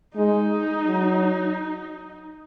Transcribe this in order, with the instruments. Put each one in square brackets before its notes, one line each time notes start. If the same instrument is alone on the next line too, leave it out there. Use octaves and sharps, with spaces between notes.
[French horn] G#3 [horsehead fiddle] D#4
[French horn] F#3